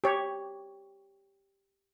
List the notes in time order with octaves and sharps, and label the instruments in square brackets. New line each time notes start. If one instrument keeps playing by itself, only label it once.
[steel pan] G4 C#5